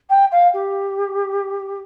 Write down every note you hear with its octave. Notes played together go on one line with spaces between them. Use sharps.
G5
F5
G4